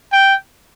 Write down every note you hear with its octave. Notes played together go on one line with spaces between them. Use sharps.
G5